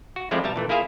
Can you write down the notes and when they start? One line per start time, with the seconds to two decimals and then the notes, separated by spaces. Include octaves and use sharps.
0.16 F#4
0.31 F3 G#3 A3 C4 E4 D5
0.44 B2 G3 E5 A5 A#5
0.56 A#2 E3 A3
0.69 A#3 E4 F4 G#4 E5 F5